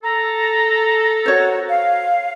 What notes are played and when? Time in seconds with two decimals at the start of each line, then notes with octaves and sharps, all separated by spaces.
0.03 A4 A#5
1.26 F#4 C5 C#5
1.69 F5